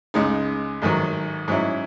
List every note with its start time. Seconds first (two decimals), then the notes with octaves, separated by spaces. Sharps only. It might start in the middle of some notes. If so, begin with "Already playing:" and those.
0.14 C#2 C#3 G#3 D#4
0.82 A1 G#2 D#3 F#3
1.48 G#2 F#3 C#4 E4